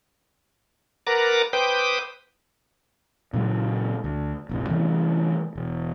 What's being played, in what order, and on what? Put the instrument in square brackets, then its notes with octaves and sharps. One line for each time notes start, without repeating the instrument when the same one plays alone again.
[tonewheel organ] A#4 B4 F#5 A#5 D6 A6
B4 C5 G5 D6 D#6
[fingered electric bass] A#2 C#3 F#3 G#3
D2
F1 A#1 C#3
C3 E3 A3 C#4
E1